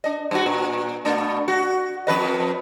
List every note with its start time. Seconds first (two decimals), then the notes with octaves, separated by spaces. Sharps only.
0.04 D4 D#5
0.31 G2 F#4
0.46 A#2
1.05 B2 A3 D4
1.48 F#4
2.07 F2 B4 D#5